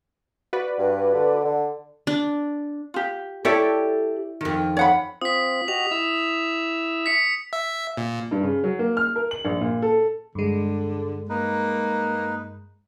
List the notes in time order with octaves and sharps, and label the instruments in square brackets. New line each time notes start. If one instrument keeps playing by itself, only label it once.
[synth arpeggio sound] F#4 B4 D5
[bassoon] G2
D3
D3
[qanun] D4
[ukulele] F4 G4
[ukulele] E4 C#5 E5 [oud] G4 A4 D5
[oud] F2 D#3
[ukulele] C#5 F#5 B5
[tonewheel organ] C4 F4 [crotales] D#6 B6
[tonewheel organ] F#4 G4 D#5 [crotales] F7
[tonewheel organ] E4 E6
[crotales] B6 C#7
[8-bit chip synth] E5
A#2
[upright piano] G2
C#3
F#3
A#3
F6
A#4
F#7
A#1
A#2
A4
[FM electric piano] G2 G#3 [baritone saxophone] D3
[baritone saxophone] A#3 [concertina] D#4 B4